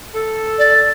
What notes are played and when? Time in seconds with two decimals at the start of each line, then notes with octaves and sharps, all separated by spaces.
0.14 A4
0.58 D5